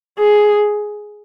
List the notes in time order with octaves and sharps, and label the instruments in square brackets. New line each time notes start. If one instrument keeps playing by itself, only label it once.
[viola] G#4